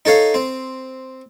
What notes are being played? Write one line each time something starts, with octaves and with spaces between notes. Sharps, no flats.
D#4 A4 C#5 F5
C4